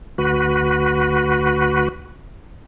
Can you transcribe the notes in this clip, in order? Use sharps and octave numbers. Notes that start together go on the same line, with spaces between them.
D2 F#4 B4